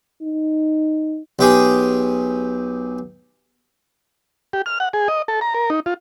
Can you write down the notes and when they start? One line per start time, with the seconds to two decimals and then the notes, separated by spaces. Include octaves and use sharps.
0.23 D#4
1.39 B1 G4 G#4
4.53 G4
4.66 F6
4.80 F#5
4.93 G#4
5.08 D#5
5.28 A4
5.41 A#5
5.54 A#4
5.70 D#4
5.86 F4